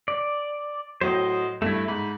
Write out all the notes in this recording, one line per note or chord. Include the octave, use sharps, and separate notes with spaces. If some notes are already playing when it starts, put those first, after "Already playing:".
D5
A2 F#3 C5 D#5
G2 A3 E4
G#2 B5